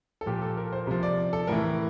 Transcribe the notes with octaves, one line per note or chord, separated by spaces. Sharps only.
A4
A#2 F3 G4
A4
A#4
C5
C3 F3
D5
A4
A2 E3 A#4